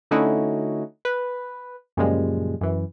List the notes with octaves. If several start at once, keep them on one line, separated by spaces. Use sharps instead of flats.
D3 A3 C#4 D#4 E4 F#4
B4
F#2 A#2 C#3 F3 G3 G#3
F#2 E3